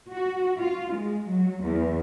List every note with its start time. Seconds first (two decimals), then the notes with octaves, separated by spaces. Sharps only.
0.13 F#4
0.60 F4
0.95 G#3
1.29 F#3
1.63 E2